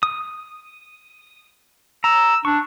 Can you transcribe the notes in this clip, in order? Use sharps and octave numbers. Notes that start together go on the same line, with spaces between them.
D#6
A#5 E6
D4 C#6